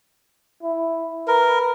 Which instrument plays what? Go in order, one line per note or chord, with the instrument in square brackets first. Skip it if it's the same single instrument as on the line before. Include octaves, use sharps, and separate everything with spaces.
[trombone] E4
[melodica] A#4 [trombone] B4